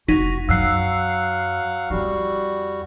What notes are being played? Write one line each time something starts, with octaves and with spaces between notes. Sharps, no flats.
F1 D#4 F#4 B6
F#2 F#3 F5 F#5 E6 F#6 C7
F2 G3 E4 F#4